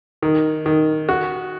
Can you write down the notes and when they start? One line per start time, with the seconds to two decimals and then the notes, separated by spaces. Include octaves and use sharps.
0.22 D#3
0.66 D#3
1.09 F#4